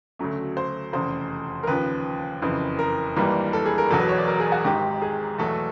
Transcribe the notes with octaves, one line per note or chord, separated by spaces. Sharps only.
D2 C#3 F#3 A3
C5
F1 E2 C#3 C5
A#4
D#2 C#3 F3 B4
F#1 F2 C#3 E3
A#4
G#1 G2 E3 G3 A#3
A4
G#4
A#4
E1 E2 B2 F#3 A4
B4
C#5
D5
A#4
G#4
F#4
G#1 G#2 D#3 G4
G#4
E2 B2 F#3 A3 A4